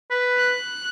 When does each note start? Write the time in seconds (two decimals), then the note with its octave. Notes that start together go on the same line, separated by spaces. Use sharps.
0.10 B4
0.38 F#6